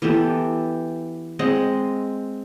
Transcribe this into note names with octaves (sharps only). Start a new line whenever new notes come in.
E3 B3 G4 A4
G#3 C4 D#5 F#5